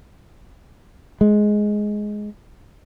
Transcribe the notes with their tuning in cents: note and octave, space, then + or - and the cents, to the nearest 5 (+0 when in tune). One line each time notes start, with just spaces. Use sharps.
G#3 +10